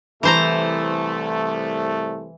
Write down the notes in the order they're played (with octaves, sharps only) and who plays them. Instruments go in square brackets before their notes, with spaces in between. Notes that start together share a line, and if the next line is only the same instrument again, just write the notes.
[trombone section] C2 A3 [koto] E3 C5 A#5